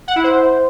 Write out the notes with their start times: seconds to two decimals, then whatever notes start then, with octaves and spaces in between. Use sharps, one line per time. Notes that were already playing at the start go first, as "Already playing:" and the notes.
0.08 F#5
0.16 E4
0.24 C5